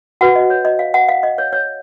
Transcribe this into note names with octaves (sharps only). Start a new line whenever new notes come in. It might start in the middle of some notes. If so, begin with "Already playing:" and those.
F#4 B4 F#5
D#5
C#5
D#5
F5
F#5
F5
D#5
C#5
C#5